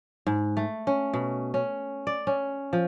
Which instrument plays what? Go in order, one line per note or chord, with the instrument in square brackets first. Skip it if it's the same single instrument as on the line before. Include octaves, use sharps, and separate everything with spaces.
[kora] G#2
A3
C#4
B2
C#4
D5
C#4
F3